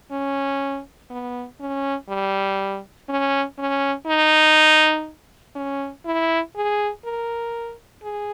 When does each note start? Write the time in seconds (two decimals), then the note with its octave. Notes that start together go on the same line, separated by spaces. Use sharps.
0.11 C#4
1.10 B3
1.61 C#4
2.09 G3
3.09 C#4
3.59 C#4
4.07 D#4
5.56 C#4
6.06 E4
6.56 G#4
7.05 A#4
8.03 G#4